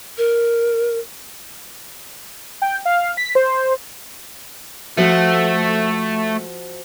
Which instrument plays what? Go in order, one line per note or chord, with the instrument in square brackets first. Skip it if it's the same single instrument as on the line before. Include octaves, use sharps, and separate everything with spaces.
[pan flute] A#4
[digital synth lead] G5
F5
B6
C5
[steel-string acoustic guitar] F3 F#4 C5 [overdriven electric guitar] A3